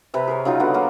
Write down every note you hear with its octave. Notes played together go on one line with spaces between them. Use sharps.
C3 C4 B4
G#4 A#4 C#5
C#3 F#3 D#4 F4
D3 B3 F#4
A#3 F4 F5